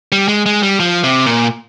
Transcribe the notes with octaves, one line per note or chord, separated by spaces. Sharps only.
G3
G#3
G#3
G3
F3
C3
A#2